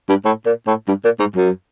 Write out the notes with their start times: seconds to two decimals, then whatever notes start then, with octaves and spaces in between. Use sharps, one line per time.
0.09 G2
0.25 A2
0.46 A#2
0.67 A2
0.88 G2
1.04 A#2
1.20 G#2
1.36 F#2